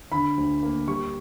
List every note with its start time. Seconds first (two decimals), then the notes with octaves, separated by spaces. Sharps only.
0.12 D3 B5
0.37 D2
0.63 A#3
0.88 G3 C#6